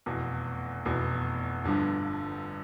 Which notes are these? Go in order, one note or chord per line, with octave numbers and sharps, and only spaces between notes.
F1 E2 B2
F1 E2 B2
G1 G2 D3 F3